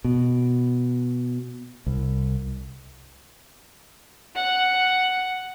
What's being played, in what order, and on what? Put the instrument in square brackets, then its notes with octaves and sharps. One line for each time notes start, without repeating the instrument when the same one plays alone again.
[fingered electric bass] B2
C2
[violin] F#5